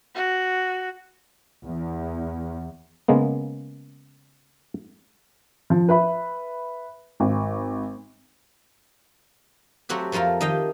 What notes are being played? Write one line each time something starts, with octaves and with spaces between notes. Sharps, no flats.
F#4
E2
C#3 G#3 A#3 B3
F3
B4 E5 B5
G#1
F#3 A3 C4 F#4 G4
F2 F3 A3 F4 A#4
D#3 G4 D#5 F5 G5